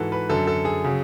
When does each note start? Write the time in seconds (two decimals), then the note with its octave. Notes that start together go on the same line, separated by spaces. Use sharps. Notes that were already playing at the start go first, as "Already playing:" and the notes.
Already playing: G#2 E3 F#4 A4
0.12 B4
0.29 F#2 D3 F#3 A4
0.47 A4
0.65 G#4
0.84 C#3 F#3